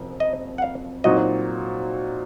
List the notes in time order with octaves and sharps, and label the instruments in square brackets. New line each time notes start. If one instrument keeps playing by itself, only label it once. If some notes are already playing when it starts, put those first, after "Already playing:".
Already playing: [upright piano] F#1 F2 C3 F3
[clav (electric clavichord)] D#5
F#5
F5
[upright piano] A#2 F#3 C4 D#4 F#4 [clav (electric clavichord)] D#5